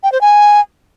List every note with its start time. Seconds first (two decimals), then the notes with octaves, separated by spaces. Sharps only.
0.03 G5
0.12 C5
0.21 G#5